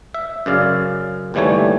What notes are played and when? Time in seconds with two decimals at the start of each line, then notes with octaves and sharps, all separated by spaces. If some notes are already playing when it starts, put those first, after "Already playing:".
0.14 E5
0.46 F#2 C#3 D5 F5
1.34 G1 D#2 E3 G3 A3 C#5